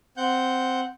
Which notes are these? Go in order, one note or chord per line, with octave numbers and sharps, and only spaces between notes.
C4 F#5 G6